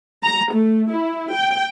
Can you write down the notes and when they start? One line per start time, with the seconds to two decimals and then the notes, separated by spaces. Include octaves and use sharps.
0.24 A#5
0.54 A3
0.93 E4
1.33 G5